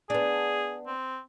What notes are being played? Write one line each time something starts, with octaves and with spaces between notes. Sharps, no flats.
B3 D4 G#4
C4